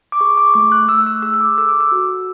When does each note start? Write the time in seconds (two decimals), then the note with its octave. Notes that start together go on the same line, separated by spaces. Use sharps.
0.12 D6
0.21 G#4 C#6
0.37 D6
0.47 C#6
0.54 A3 D6
0.72 F#6
0.88 A3 E6
1.06 E6
1.22 G#4 E6
1.34 E6
1.41 D6
1.58 A4 E6
1.69 D6
1.80 E6
1.92 F#4